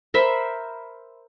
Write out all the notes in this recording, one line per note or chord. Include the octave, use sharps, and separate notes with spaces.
A#4 C5 E5 B5